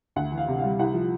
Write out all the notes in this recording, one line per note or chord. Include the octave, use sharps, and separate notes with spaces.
D2 F#5
E3
F5
C3
F5
G3
C2 F#5
F3